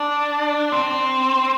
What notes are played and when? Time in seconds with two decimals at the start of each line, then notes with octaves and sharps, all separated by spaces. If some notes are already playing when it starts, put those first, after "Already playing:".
Already playing: D4
0.72 C4